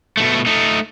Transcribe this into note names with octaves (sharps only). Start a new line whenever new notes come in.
B2 A3
A3 D#4